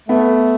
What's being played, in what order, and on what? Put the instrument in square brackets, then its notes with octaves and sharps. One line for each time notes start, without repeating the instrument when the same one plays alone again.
[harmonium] A3 [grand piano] B3